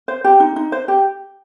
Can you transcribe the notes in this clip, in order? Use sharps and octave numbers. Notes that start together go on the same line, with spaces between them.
C5
G4
D#4
D#4
C5
G4